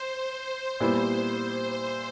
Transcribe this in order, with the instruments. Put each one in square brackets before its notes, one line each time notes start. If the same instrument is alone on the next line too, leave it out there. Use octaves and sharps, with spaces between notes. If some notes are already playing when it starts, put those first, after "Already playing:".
Already playing: [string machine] C5
[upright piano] A#2 G3 B3 E4
[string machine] C5